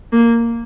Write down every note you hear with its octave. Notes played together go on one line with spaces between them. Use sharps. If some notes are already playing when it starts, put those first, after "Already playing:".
A#3